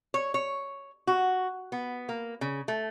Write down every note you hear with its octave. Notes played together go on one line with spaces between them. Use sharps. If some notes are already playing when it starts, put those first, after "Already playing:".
C#5
C#5
F#4
B3
A#3
C#3
A3